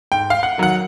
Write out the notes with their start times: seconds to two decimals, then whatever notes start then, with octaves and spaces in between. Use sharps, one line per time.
0.12 G#2 G5
0.30 F5
0.43 F#5
0.58 D#3 F#3 F#5